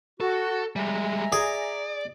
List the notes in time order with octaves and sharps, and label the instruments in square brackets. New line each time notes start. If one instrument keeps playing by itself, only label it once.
[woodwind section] F#4 [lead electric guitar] A4
[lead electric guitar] G3 G#3 [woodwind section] E5 G#5 A#5
[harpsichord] G#4 [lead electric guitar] D5